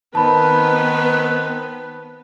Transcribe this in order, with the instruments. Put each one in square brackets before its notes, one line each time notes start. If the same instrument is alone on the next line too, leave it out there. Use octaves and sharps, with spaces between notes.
[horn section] D#3 C4 [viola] B3 B4 [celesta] A5 B5